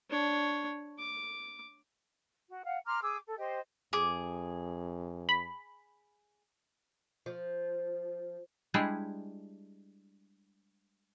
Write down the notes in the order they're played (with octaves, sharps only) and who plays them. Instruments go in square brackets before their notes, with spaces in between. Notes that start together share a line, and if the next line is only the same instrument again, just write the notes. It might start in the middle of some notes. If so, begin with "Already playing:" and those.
[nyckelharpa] D4 C#5
D6
[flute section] F#4
F5 F#5
A#5 C6 D6 F6
G#4 D6 E6
A4
G4 C5 D#5
[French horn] F2 [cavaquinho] G#4 D6
[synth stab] B5
[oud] F3
[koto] G3 G#3 D4 E4 G4 G#4